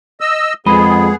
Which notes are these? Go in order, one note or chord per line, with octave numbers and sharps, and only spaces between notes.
D#5 E6
F2 G#3 B3 G#4 D#5 B5